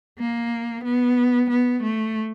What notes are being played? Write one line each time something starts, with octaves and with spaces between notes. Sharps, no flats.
A#3
B3
B3
A3